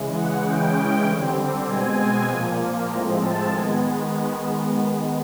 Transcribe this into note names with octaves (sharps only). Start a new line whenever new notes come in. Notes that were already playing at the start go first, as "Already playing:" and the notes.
Already playing: C#3 E3 G#3
F#5
C#3 E3 G#3 C#4 G5
D3 G3 C4
B2 G#3 C4 G#5
A#2 F3 A#3
A2 F3 G#3 C4 A#5
A5
D#3 G#3 B3 G#5